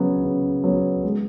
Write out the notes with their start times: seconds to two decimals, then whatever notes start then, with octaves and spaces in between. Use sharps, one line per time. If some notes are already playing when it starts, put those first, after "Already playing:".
Already playing: C#3 F#3 B3
0.23 C#3
0.64 F#3 B3
1.03 G#3